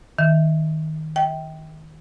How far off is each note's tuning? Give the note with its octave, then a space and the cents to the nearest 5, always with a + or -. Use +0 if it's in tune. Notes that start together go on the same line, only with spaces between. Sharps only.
D#3 +10 E5 +0
E5 -45 G5 -5